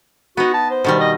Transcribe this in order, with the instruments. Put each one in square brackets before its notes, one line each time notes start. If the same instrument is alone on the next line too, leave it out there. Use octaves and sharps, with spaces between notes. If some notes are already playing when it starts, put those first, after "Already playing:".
[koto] B3 D#4 [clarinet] F#4
[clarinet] A5
C5
[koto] B2 D#3 G3
[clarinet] D#5